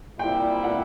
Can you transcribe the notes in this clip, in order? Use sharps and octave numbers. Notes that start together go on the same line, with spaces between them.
A#2 G3 C4 E4 G5
F#5